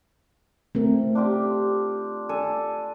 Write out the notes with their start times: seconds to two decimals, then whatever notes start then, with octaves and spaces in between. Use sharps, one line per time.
0.75 A3 C4 A#4
1.15 D4 F4 G4
2.29 D4 A4 G#5